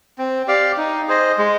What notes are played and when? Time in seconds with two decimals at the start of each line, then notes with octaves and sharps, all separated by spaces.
0.18 C4
0.48 G4 D5 F5
0.77 D#4
1.08 G#4 C5 D#5
1.38 G#3